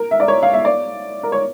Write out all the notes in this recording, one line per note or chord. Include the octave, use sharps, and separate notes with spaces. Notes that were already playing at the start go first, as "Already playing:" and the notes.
Already playing: A#4
E5
D5
C#5
F5
E5
D5
A#4
C#5